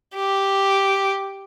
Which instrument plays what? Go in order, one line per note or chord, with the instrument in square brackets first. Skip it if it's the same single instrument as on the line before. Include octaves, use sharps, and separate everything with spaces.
[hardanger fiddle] G4